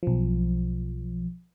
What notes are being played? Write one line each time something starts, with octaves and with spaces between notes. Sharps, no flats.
B1 F3